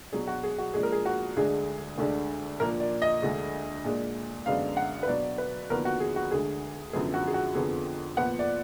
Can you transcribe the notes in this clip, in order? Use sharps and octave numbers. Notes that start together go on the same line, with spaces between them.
B2 F#3 D4 G#4
F#4
G#4
F#4
A#2 F3 G#3 D4 G#4
A#4
G#4
F#4
D2 D3 G#3 D4 G#4
D2 D3 G#3 D4
A#2 F3 A#3 D4 A#4
D5
D#5
D2 D3 G#3
A#2 G#3 D4
F#2 D3 G#3 B3 D4 F5
F#5
B4
B2 F#3 D4 D5
B4
D#2 D3 F3 B3 D4 A#4
F#4
G#4
F#4
D2 D3 G#3 G#4
F#2 D3 F3 G#3 B3 G#4
F#4
G#4
F#4
F2 D3 F3 B3 G#4
A#2 F3 B3 F#5
D5